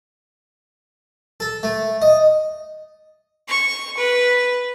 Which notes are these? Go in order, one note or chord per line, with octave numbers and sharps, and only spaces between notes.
A4
A3
D#5
C#6
B4